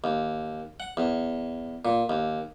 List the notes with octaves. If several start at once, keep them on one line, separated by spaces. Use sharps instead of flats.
D#2
F#5
E2
A#2
D#2